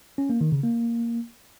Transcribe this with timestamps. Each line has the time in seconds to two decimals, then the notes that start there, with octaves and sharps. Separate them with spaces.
0.18 C#4
0.29 A#3
0.41 D#3
0.52 C#3
0.63 A#3